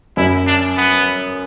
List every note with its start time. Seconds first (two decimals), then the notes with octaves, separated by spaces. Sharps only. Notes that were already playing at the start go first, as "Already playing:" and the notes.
0.17 F#2 E4
0.47 D4
0.77 B3